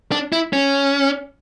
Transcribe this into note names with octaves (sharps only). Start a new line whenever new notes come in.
D4
E4
C#4